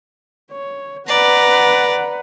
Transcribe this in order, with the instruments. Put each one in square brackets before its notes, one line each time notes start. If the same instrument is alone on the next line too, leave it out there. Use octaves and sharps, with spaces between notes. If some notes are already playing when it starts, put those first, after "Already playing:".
[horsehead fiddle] C#5
[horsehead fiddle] B4 F#5 [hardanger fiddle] D5 A#5